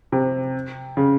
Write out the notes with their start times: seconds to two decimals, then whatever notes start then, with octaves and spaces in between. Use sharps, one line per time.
0.12 C3
0.97 C#3